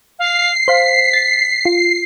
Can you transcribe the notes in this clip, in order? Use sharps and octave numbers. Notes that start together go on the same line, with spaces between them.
F5 C7
C5 F5 B6
A6
F4